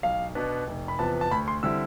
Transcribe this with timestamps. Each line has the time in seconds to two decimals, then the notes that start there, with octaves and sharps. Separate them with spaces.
0.03 B1 F5
0.35 B2 B3 D4
0.67 F1
0.88 B5
0.99 E2 C3 F3 B3 A5
1.21 A5
1.31 D2 B5
1.48 C6
1.63 D3 G3 C4 E4 E6